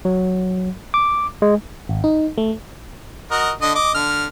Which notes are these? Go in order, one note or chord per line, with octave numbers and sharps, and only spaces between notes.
F#3
D6
G#3
G#1
D#4
A3
F#4 A#4 D#5
D3 D#5 D#6
D#5 D6
D3 F6